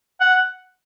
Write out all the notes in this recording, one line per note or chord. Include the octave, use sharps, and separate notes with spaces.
F#5